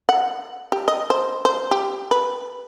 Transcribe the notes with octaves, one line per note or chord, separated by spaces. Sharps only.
F#5
G4
D#5
C5
C5
G4
B4